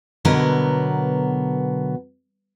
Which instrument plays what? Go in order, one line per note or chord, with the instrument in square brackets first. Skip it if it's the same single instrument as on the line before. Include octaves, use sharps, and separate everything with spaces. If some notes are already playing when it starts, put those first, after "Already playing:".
[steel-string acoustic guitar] B2 D3 F#3 B3 A#4